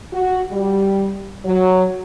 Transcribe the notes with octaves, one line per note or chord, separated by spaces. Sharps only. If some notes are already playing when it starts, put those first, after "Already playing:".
F#4
G3
F#3